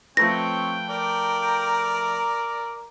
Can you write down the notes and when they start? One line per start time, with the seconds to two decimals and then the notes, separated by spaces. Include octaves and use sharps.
0.17 F3 A3 C4 B4 C#5 G5 A#6
0.90 A#4 D5 A#5